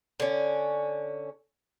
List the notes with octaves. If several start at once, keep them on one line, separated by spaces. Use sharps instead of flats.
D3 C#4